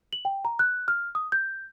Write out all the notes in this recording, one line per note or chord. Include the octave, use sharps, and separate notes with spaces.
F#7
G5
A#5
F#6
F6
D#6
G6